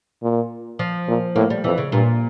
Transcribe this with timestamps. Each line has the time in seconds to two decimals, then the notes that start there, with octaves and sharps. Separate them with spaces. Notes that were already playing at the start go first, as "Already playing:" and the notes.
0.22 A#2
0.79 F3
1.08 A#2
1.36 A2 A#3
1.50 G3
1.64 F2 E3
1.78 C#3
1.92 G2 A#2